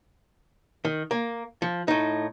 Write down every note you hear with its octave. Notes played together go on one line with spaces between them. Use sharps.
D#3
A#3
F3
A2 D#4